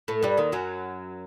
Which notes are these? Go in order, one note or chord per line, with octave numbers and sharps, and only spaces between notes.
A2 A3
G2 G3
D#2 D#3
F#2 F#3